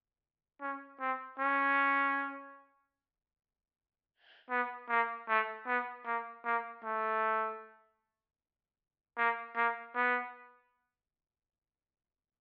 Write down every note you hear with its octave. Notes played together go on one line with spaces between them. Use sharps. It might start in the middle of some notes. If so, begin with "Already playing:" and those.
C#4
C4
C#4
B3
A#3
A3
B3
A#3
A#3
A3
A#3
A#3
B3